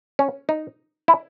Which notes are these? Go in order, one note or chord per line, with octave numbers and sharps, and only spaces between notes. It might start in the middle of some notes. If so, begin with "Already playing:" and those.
C#4
D#4
E4